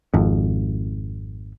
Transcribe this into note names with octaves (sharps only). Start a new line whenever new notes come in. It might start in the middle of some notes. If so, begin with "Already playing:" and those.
G#1 F2